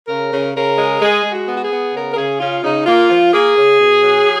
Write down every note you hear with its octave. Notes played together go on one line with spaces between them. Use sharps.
C#3 A#4
C#3
C#3 A#4
G#3
G#3 G#4
G#3
F#4
B3
F#4
G#4
B3
C#3 A#4
A#4
C#3 G#4
C#3 F4
C#3 D#4
A#3 F4
F3
A#3 G#4
C#3
B2
F#3